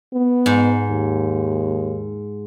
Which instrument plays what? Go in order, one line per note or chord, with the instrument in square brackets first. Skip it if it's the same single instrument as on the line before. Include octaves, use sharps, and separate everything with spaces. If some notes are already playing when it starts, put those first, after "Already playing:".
[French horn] B3
[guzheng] G#2
[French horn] D#2